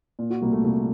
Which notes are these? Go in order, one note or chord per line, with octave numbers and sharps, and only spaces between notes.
A#2
F#4
C2 A#3
A3
C2 A#3